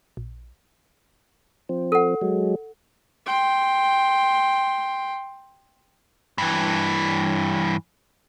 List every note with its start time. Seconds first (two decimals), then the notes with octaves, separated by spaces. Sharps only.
0.17 A#1
1.69 F3 C4
1.92 A4 F#5
2.21 F#3 G#3
3.26 G5 C6
6.38 G2 E3